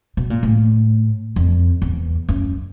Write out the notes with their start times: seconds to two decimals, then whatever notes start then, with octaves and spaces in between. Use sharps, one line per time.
0.17 B2
0.30 A#2
0.43 A2
1.36 F2
1.82 E2
2.29 F#2